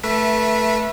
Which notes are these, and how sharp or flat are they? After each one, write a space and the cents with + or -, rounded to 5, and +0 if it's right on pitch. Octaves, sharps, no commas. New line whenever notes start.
A3 +0 B4 -25 E5 +15